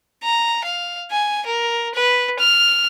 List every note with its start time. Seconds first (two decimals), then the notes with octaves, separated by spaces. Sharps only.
0.23 A#5
0.64 F5
1.11 G#5
1.46 A#4
1.94 B4
2.39 F6